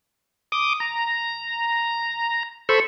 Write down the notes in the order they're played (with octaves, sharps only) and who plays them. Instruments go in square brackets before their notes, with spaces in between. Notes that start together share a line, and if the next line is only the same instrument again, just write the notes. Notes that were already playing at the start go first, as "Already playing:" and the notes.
[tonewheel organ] D6 D#6
A#5
A4 C5 B5 C#6